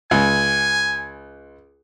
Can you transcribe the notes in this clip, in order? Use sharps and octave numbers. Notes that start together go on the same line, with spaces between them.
C#2 G#5